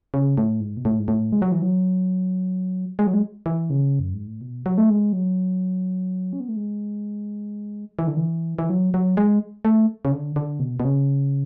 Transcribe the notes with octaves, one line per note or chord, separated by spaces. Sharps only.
C#3
A2
G#2
B2
A2
G#2
A2
G#3
F#3
E3
F#3
G#3
F#3
G#3
E3
C#3
F#2
G#2
A2
B2
F#3
A3
G#3
F#3
C#4
B3
A3
G#3
E3
D3
E3
E3
F#3
F#3
G#3
A3
C#3
D3
D3
B2
B2
C#3